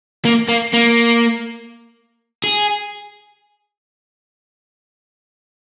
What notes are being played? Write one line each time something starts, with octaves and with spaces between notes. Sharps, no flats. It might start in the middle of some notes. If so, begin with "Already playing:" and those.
A#3
A#3
A#3
G#4